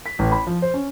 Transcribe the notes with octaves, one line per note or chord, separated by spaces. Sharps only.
B6
A1
B5
F3
C5
C#4